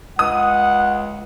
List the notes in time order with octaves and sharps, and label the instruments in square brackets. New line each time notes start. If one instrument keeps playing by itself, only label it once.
[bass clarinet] C#2 [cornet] F#5 [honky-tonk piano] D#6